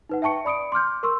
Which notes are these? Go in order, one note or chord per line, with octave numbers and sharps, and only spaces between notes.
D#4 B4 F#5
E5 G5 A5 C#6 C#7
D5 B5 D#6 C#7 D7
C6 D6 F6 G6
A#4 C6 C#6 E6